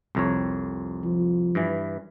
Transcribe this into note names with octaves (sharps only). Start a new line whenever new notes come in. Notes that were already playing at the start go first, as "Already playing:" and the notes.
C2 F2 C#5
F3
G2 E3